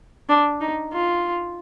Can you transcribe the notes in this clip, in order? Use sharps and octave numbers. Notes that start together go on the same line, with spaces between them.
D4
D#4
F4